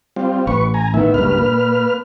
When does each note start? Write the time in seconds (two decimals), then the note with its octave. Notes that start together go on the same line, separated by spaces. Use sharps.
0.16 G3 C4 F4
0.47 A1 B4 C#6
0.74 G#5 A#5
0.94 A2 D#3 B3 E5
1.14 C#2 G2 A#3 B4 F6
1.38 A#2